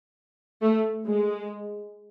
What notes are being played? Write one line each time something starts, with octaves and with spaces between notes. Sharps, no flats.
A3
G#3